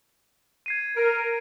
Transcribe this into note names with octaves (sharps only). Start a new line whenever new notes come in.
G#6 C7 D#7
A#4 D7